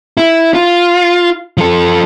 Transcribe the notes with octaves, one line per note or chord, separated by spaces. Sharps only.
E4
F4
F3 A4